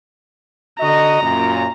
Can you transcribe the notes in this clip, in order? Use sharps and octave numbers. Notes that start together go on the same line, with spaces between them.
D3 F#4 D#5 A#5
F#2 A#2